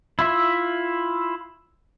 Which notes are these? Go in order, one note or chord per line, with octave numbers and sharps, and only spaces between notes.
E4 F4 E5